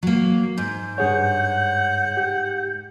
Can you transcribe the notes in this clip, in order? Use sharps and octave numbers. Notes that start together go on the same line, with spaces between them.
F#3 A#3
G#2 G6
G2 G#4 C#5 F#5
G4